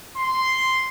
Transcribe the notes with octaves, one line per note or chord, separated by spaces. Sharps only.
C6